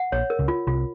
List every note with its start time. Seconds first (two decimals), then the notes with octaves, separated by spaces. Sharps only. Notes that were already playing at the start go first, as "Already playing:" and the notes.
Already playing: F#5
0.12 A#1 A#2 C#5
0.30 A#4
0.39 C#2 C#3
0.48 F4
0.67 C2 C3 F4